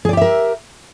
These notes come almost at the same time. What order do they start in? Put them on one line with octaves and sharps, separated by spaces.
G#4 D5 G4 E5 A#4